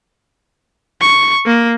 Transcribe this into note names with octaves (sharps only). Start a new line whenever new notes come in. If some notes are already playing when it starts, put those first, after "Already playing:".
C#6
A#3